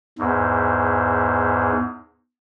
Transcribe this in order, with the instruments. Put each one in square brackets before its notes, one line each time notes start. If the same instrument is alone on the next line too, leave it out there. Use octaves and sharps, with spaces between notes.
[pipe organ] E2 G#2